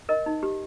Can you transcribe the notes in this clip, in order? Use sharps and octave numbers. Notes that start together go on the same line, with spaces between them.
A#4 D#5
D#4
G4